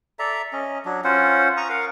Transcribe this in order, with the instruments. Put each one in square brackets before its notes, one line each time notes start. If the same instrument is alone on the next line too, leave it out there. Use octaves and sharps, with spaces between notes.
[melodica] A4 D5 E5 A#5
C#4 D#5
F#3 D4
C#4 F4 C5 F#5
A#5 C#6 D#6
A#4 F5 F#5